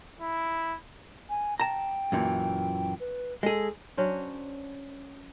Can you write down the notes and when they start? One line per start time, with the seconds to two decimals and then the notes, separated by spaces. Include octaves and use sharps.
0.21 E4
1.29 G#5
1.60 G5 A5 A#5
2.12 F#2 A#2 E3
3.00 B4
3.43 G#3 G#4 A4
3.97 F#3 C#4 D4 C5